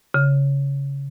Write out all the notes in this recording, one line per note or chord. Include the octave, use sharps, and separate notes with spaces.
C#3